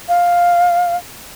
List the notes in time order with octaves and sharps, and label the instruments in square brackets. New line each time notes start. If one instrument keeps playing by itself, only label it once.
[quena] F5